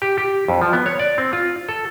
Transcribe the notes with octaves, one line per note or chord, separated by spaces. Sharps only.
G4
G4
F2
F3
B3
C#5
D5
C4
F4
A4